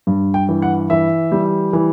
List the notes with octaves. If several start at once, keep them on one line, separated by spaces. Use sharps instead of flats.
G2
G5
E3
F#5
E3 E5
G3
E3